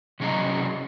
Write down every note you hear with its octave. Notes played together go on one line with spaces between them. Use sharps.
C3 F#3 C#4 G#4 D#5 A#5